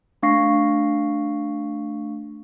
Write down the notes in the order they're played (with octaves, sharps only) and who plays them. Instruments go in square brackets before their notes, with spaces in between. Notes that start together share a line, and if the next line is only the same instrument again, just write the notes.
[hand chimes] A3 D4 F5 C#6 A#6 C7